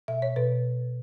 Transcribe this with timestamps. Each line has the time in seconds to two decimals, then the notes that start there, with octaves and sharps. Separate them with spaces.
0.08 B2 E5
0.22 C#5
0.36 B2 B4